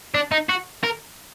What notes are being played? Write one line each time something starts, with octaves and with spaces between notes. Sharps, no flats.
D4
D#4
F#4
A#4